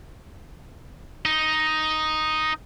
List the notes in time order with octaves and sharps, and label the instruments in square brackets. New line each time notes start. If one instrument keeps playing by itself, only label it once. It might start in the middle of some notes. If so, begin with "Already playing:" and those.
[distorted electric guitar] D#4